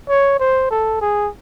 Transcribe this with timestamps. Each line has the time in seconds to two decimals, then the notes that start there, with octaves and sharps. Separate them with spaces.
0.09 C#5
0.40 C5
0.71 A4
1.01 G#4